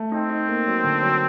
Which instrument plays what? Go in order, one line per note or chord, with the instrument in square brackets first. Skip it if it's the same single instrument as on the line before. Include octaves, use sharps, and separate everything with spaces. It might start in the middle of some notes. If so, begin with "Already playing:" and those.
Already playing: [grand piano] A3
[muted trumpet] C4 [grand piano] D#4
[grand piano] D#4
A#3
F#3
D3
F#3